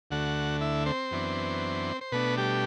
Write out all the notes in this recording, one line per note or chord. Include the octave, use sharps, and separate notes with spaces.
D2 D3 A3 F#4 F#5
E4 E5
C4 C5
F#2 E3 B3 D4
C5
B2 A3 B3 D4 B4
G3 G4